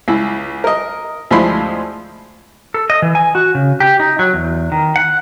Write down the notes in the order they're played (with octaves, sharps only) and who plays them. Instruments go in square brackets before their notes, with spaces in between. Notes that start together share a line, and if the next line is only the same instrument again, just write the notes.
[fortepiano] C#2 E4
A#4 D#5
D2 F3 G#3 E4 B5 C6
[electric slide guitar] A4
D#5
E3
G#5
F#4
C#3
G4
D#4
F#3
E2
D#3
F#5